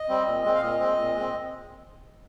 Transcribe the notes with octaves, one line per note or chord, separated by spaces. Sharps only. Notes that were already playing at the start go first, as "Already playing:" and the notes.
Already playing: D#5
G3 C4
A#2
G#3 C4
F5
A#2 D#5
G#3 C4
A#2
G#3 C4